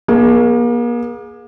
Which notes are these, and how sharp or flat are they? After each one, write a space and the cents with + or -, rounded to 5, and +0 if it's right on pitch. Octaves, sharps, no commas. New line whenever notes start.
A#3 +40 G#4 +0